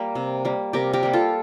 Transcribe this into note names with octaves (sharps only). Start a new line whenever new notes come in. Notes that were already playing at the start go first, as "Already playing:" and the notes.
Already playing: G3 A#3 G4 A#4
C3
G3 A#3
C3 G4 A#4
G4 A#4
G3 A#3
F4 A4